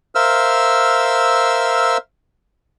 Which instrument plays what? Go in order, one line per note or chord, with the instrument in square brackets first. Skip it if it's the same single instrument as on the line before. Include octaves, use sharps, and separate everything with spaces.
[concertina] A#4 C5 E5 F5 E6 F6